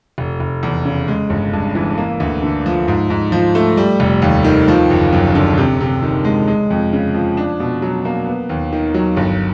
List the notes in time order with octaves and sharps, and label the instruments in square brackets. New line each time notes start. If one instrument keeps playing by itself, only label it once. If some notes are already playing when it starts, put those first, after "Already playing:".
[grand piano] F1
F1
E2
C#3
G#3
G1
G2
E3
A#3
D2
D3
F3
G#2
G#2
F3
A3
G3
F1
D#2
D#3
F3
F#1
F#2
D3
C3
C3
D#3
G#3
G#3
F2
C#3
F3
D4
B2
F#3
A#3
B3
D#2
D#3
F#3
G1